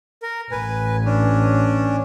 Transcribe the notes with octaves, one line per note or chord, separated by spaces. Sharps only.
A#4
A1 B4 G#5
C#4 D4